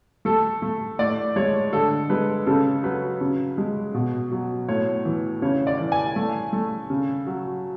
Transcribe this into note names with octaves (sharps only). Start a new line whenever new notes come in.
A3 A4
A3
A2 D5
G#3 C#5
D3 A4
G#3 B4
C#3 A4
F#3 B4
C#3
G#3
B2
F#3
A2 C#5
E3
C#3 C#5
D5
E3
G#5
A3
A3
C#3
F#3